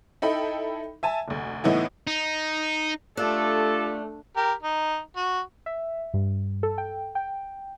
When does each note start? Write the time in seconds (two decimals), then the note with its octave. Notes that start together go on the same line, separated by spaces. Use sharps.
0.22 D#4 E4 A4 G5 B5
1.03 E5 G#5 A5
1.28 F1 D2
1.64 A2 E3 B3 D#4 E4
2.07 D#4
3.17 A3 D4 F4 G4 A4
4.37 G4 A#4
4.63 D#4
5.16 F#4
5.66 E5
6.14 G2
6.63 A4
6.78 G5
7.15 G5